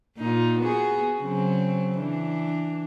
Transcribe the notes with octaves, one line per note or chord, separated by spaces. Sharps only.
A#2 D#4 F4
B3 F#4 G#4
C#3 F#3 C4
E3 D4